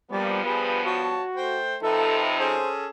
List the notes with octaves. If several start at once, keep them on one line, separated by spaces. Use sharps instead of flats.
G2 F3 G3 A#3 B3 D5
G3 G#4 B4
F#4 C#5 A5
A3 C5 G5
C3 F3 D#4 A4 B4 E5
C#4 G#4 A4 C5